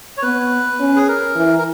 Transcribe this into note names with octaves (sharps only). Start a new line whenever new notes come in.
C#5
B3 B4
C#4
G#4
A#4
E3
A#4